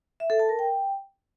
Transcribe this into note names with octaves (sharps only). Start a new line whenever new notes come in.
E5
A4
A5
A#4
G5